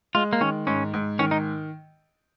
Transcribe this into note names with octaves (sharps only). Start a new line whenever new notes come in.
G#3 F4
A#3
D#3 C#4
G#2 C#4
G#2
D#3 C#4
D#4